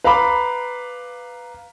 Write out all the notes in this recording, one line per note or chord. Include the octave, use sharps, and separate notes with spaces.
B4 F5 A#5 B5 D6